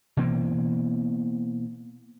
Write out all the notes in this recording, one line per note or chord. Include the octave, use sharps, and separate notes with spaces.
B2 E3 A#3 C4